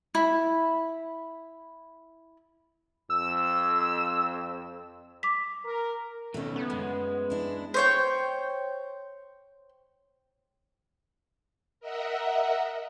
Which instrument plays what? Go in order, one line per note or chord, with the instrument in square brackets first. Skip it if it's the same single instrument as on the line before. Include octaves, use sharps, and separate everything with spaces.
[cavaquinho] E4 B5
[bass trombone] F2 [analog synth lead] E6
[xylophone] D6 B6
[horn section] A#4
[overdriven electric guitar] B2 D#3 [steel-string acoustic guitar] A3 C#4
[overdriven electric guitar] C#2 [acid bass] B3
[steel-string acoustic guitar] F#2 [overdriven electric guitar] G#3
[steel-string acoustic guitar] D4 E4
[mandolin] C5 C#5 G5
[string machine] A#4 D#5 E5 F#5